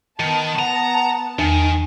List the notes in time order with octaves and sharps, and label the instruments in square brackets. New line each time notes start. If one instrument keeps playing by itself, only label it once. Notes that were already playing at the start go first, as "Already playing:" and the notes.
[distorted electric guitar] D#3 [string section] B3 A5
[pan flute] F#5 [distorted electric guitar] A#5
[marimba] E2 [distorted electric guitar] D#3 [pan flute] G#5